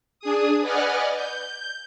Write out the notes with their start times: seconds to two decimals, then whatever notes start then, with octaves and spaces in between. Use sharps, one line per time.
0.20 D4 G#4 D#6
0.61 B4 D5 D#5 F#5 G#5 F6
1.15 G6